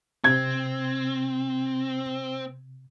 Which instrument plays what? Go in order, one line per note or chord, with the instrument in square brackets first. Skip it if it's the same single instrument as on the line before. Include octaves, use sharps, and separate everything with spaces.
[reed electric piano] C3 [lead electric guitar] C4 [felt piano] G#6